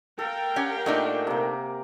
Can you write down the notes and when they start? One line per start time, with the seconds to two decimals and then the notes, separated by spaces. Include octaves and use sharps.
0.19 A4 A#4 F5 G5
0.56 C#4 G4 F#5 G#5
0.86 A#2 A3 D4 D#4
1.27 C3 A#3